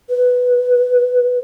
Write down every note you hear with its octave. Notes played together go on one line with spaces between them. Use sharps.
B4